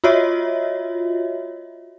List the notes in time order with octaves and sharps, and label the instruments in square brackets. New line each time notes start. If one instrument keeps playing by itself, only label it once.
[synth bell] F4 F#4 C#5 D#5 E5